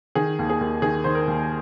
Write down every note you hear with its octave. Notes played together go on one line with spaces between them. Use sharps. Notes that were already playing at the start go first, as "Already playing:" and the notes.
D#3 G#4
D#2
G#4
D#2
D#3 G#4
D#3 C5
A#4
D#2